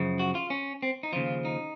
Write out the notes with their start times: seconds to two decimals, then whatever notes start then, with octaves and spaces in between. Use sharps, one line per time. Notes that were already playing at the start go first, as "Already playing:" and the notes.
Already playing: F#2 C#3 F3
0.19 F#4
0.35 F4
0.50 C#4
0.83 C4
1.03 D#4
1.13 D#2 C#3 F3 F4
1.45 D#4